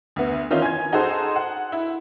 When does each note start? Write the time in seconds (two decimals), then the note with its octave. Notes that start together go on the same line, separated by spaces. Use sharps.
0.16 D2 B3
0.51 D#3 E3 C#4 D#4 F4
0.62 G#5 G#6
0.92 D#4 F#4 G#4 A4 C5
1.36 F#5
1.72 E4